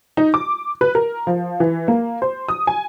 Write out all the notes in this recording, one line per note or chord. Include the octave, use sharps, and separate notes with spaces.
D#4
D6
B4
A#4
F3
E3
A#3
C5
D#6
G#5